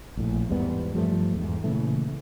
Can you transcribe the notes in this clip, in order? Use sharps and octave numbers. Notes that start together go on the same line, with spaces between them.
A#1 A2
E2 G#2 G3 B3
G2 F3 G3 A3
E2 G#2
A#2 C#3 E3 A3